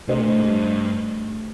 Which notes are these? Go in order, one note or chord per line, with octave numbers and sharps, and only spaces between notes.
C3 A3 D4 G4 C5 D#5
A#2
A2
G#2
G2